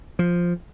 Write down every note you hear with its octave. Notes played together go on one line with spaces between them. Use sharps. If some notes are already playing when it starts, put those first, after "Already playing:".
F3